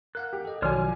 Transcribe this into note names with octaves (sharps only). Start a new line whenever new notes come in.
A#4 F5 F#5 F#6
G4
A4 D#5
B1 D#3 F#3 C#5 D5 G#5 C6 F6
F3